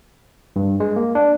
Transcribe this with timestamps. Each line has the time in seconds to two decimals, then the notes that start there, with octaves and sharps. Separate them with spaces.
0.56 G2
0.80 G#3
0.96 A#3
1.15 D4